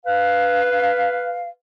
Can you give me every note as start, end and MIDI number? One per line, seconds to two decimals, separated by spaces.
0.06 1.48 71
0.06 1.48 77